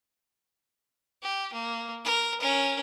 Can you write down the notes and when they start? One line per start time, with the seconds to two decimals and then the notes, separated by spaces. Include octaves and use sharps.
1.22 G4
1.53 A#3
2.05 A#4
2.40 C#4 A#4